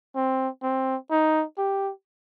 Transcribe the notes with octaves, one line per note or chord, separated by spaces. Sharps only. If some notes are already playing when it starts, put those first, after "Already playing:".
C4
C4
D#4
G4